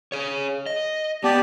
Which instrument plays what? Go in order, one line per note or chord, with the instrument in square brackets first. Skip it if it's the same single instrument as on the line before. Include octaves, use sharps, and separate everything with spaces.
[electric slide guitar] G#4 C#5
D#5
[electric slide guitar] B3 [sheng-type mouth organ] G4 D5 A5